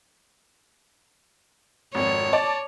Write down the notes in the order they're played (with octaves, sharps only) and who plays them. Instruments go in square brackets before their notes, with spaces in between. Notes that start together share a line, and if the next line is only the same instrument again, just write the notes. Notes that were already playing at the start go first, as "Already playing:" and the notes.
[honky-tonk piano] G#1 F2 [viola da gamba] C#5
[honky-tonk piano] D5 A5 D6